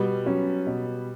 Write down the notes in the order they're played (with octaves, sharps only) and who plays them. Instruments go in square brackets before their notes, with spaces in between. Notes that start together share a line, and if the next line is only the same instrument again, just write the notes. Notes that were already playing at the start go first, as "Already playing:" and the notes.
Already playing: [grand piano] B2 [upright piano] G3 B3
[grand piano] F#3 C#4
B2